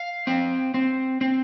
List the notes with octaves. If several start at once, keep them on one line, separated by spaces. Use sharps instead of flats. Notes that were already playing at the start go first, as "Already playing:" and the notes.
Already playing: F5
C4
C4
C4